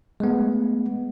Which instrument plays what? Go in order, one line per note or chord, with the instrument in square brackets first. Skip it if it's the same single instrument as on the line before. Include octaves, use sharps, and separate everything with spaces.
[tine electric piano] G#3 A3 B3